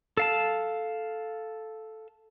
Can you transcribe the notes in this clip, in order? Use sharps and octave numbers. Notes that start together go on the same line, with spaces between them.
A4 F5 A5